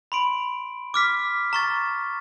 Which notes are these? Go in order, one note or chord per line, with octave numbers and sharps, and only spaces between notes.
B5 C6 D7
D6 F6 B6
A#5 C#6 A6